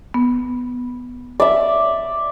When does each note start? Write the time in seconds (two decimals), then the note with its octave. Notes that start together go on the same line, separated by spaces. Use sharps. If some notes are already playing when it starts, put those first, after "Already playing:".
0.14 B3
1.40 D5 E5